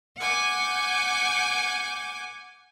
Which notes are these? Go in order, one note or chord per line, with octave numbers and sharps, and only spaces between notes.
F#5 G#5 D6 G6